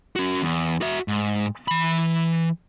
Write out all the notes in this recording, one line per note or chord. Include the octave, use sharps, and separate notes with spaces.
C#4 F#4
E2
F#4 E5
G#2
E3 B5